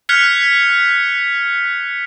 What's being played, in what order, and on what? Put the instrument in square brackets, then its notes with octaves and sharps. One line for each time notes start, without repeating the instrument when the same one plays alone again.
[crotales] F6 F#6 G#6 B6 C#7 F7